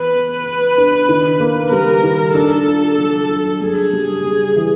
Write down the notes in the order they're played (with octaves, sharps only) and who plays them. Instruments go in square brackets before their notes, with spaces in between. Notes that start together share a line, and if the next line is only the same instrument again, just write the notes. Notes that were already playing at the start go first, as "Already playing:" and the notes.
Already playing: [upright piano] E3 B3 [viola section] B4
[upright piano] B3
B3
D4
D#3
A#3
[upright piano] G3 [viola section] A#4
[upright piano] D#3
[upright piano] D4 [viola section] A4
[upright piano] F4
F#3
D4
[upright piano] G2 [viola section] G#4
[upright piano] G3
G3
E3